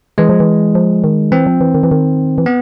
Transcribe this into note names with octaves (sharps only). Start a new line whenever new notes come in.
E3 G#3
F3
E3
F3
D#3
E3 C4
F3
E3
D#3
E3
D#3
E3
B3